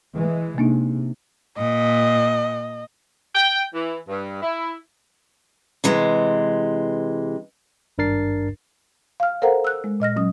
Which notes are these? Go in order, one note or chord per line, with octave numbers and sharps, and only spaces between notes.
E3 G#3
C3 A#3 D4 D#4
A#2 D#5
G5
E3
G2
E4
C3 E3 G#3
G#1 G2 D4 A#4 A6 C7
F5 F6
A4 A#4 C5 F5 F#5 A#5
E6 F#6
G#3
A#2 D#5 F6 A#6
F#3 C#4 D#6